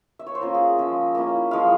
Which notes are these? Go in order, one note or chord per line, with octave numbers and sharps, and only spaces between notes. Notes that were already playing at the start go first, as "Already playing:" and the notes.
E5
C#5
C5
A#3 C#4 F4 A#4
G#4
F3 G#3 C#4 E5
A#3 C#4 E4
F3 G#3 E4 F5